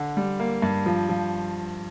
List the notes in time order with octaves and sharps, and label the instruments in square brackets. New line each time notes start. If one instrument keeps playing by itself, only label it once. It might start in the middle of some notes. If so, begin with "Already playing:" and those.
Already playing: [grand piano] D3
G3
A#3
G2
F3
F3